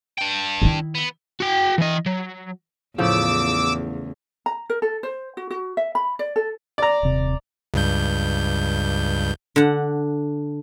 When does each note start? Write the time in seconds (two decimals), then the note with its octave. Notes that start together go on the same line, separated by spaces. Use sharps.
0.19 D4 G5
0.62 D#3 E4
0.95 B3
1.40 F#4 G5
1.78 E3 D#5
2.06 F#3
2.98 E2 A2 C#3 F3 D6 E6
4.46 A#5
4.70 A#4
4.82 A4
5.03 C5
5.37 F#4
5.51 F#4
5.77 E5
5.95 B5
6.19 D5
6.36 A4
6.78 D5 A#5
7.03 D#1 C3
7.74 C#2 G2 G6
9.56 D3 F#5